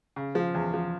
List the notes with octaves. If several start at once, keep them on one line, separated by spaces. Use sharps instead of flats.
C#3
F3
E2
F3